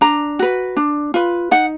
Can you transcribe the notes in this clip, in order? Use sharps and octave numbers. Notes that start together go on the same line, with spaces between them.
D4 A#5
F#4 B4
D4
F4 B4
D#4 F#5